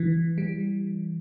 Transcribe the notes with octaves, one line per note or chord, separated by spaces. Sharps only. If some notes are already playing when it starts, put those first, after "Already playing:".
Already playing: E3
G3